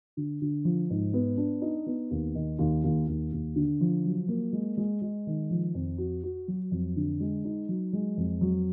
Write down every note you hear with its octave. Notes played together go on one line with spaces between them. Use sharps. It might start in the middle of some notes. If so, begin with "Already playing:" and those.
D3
D3
F3
G#2
B3
D4
D#4
B3
D#2
D#3
D#2
D#2
D#2
D#2
D3
F3
F#3
A#3
G#3
G#3
G#3
D#3
F3
F2
F#4
F#4
F#3
F2
D3
G#3
D#4
F#3
G#3
F2
F#3